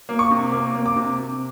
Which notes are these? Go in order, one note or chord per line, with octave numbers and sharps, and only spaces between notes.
A#3
C#6
C3
A#3 D6
A#3
D6
C3
C3